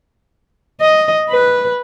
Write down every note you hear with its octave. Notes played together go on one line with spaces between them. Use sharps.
D#5
B4